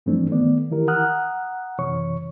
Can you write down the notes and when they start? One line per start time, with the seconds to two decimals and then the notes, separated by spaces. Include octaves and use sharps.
0.06 G2 E3 F3 A3 C4 D4
0.32 D#3 A3 B3 D5
0.71 D#3 E3 E4 G4 A#4
0.88 F#5 A#5 D#6 F6 F#6
1.79 F#2 C3 E3 C#5 C#6